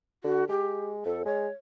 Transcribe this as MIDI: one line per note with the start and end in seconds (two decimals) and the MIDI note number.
0.24 0.44 50
0.24 0.44 66
0.49 1.01 56
0.49 0.87 67
1.06 1.23 41
1.06 1.23 69
1.25 1.47 56
1.25 1.53 73